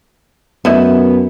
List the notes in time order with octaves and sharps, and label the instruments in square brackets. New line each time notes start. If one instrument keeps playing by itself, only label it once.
[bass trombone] F#2 [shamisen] A3 E4 D#5 [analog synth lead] B3